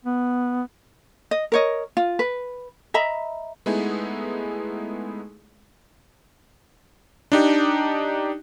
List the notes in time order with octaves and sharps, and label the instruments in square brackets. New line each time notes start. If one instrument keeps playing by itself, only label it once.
[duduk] B3
[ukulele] D#5
A#4 C#5 D#5
F4
B4
D#5 E5 A#5 B5
[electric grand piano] G#3 A3 B3 D#4 E4 G#4
D4 D#4 G4